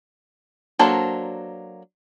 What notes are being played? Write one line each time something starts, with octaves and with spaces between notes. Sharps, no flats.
F#3 A#3 D4 A4 C5